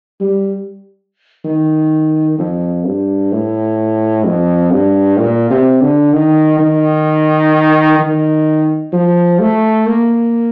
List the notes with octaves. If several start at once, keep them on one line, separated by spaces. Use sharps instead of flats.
G3
D#3
F2
G2
A2
F2
G2
A#2
C3
D3
D#3
D#3
D#3
F3
A3
A#3